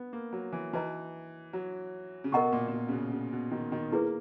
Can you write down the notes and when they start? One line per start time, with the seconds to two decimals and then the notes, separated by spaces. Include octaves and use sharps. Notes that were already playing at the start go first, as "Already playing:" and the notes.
Already playing: B3
0.13 A#3
0.33 F#3
0.53 E3
0.73 E3 D#4 F#4 B4 D#5 A#5
1.53 F#3
2.24 C#3
2.32 B2 A#4 D#5 F#5 A#5 C#6
2.52 A#2
2.68 A#2
2.73 B2
2.88 C#3
2.92 B2
3.12 C#3
3.33 B2
3.51 D#3
3.72 D#3
3.92 A#3 E4 G#4 B4